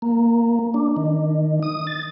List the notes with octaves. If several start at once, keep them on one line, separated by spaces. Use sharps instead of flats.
A#3
D4
D#3
D#6
A6